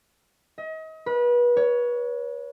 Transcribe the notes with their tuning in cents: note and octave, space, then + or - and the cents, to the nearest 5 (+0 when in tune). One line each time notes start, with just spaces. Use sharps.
D#5 +35
B4 -30
C#5 +15